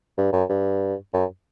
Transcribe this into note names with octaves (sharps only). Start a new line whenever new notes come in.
G2
F#2
G2
F#2